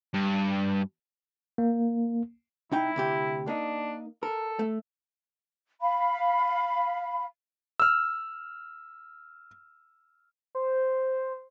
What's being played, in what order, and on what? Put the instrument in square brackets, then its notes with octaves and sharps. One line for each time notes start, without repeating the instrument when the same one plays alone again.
[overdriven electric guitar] G2
[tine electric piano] A#3
[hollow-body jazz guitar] C2 D#4 G5 [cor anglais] E4
[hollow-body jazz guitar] D2 C3 G4
[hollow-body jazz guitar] A#3 D#4 [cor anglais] D4
[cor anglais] A4 [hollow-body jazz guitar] A#4
[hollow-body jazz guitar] A3
[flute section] F5 B5
[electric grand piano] E6 F6
[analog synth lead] C5